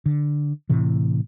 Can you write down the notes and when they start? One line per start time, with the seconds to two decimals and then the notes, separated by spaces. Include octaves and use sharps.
0.06 D3
0.69 A2 C3 E3